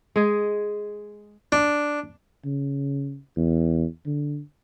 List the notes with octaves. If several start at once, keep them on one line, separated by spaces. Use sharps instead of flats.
G#3 G#4
D4
C#3
E2
D3